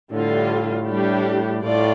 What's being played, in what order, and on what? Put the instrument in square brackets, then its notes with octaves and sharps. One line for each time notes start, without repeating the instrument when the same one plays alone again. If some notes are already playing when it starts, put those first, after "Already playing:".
[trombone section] A2 [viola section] D3 G3 F4
[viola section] G3 D4 G4
[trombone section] A2 [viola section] A3 F4 D5